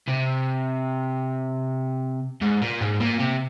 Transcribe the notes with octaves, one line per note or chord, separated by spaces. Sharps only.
C3
G#2
A#2
G#2
A#2
C3